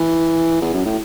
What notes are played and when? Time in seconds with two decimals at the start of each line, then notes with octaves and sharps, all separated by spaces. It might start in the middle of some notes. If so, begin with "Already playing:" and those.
Already playing: E3
0.62 E2
0.74 F#2
0.85 A2